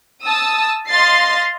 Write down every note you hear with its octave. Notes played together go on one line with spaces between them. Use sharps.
A5 D#6 E6
D#5 F5 C6 A6 C7